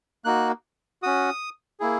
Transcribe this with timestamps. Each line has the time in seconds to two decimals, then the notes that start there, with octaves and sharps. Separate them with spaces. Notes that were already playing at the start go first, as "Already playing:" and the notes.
0.25 A#3 D#4 F#4 F#6
1.03 C#4 F#4 D#6
1.80 A#3 E4 G#4